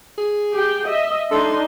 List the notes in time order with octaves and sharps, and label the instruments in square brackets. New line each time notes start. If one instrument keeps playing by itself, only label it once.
[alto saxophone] G#4
[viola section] G4 G5
D#5 E5
[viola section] D4 D#4 C6 [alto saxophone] A4